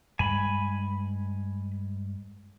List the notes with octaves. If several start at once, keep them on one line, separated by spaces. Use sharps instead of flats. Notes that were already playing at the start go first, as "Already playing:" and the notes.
G2 G#3 G#5 B5